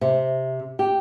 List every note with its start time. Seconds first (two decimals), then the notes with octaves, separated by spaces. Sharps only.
0.01 C3
0.79 G4